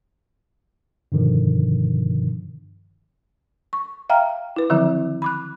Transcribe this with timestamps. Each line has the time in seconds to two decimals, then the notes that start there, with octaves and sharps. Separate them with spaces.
1.12 G2 B2 D3 D#3 F3
3.73 C#6
4.10 E5 F5 G5 A#5 F6
4.56 E4 B4
4.70 D3 D#3 F3 F#3 C4 E4
5.22 B5 D6 F#6